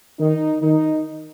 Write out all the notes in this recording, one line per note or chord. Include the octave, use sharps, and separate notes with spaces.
D#3 D#4
D#3 D#4